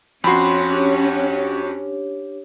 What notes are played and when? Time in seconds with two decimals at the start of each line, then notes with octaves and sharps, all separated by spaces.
0.24 F2 C#4 F#4 B5 C6 C7
0.71 D4 G4 C#5